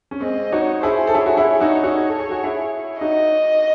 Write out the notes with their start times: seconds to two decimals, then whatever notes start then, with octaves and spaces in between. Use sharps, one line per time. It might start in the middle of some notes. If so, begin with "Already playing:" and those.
0.11 C#4
0.20 G#3 C4 D#5
0.52 D#4 F#4 C#5
0.83 E4 G#4 C5
1.07 A4
1.14 E4 G#4 C#5
1.26 F#4
1.37 E4 G#4
1.60 D#4 F#4
1.84 D#4 F#4
2.08 A4
2.19 G#4
2.31 F#4
2.44 E4 G#4
3.00 D#4 F#4 D#5